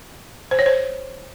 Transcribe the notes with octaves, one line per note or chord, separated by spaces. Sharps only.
C5
C#5
C5